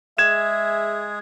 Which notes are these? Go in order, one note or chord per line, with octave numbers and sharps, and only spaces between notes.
G#3 G#4 E5 G#6 E7